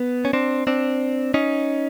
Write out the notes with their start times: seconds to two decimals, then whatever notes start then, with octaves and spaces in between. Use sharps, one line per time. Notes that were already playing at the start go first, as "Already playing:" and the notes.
Already playing: B3
0.25 C#4
0.33 C4 D4
0.67 C4 D4
1.34 C#4 D#4